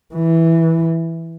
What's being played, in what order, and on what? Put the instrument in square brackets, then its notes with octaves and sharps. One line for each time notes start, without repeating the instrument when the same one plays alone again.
[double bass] E3